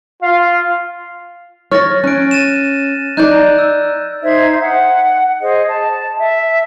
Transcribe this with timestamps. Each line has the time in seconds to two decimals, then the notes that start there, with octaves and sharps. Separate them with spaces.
0.22 F4 F5
1.72 C#5 F6 A6 A#6
2.04 C#4 F#6 D7
2.31 A6 D#7 E7
3.17 D#4 D5 F#6 G6
3.58 E6
4.22 D#4 C5 E5 G#6
4.61 F#5
5.41 G#4 C5 D#5
5.68 A5
6.18 E5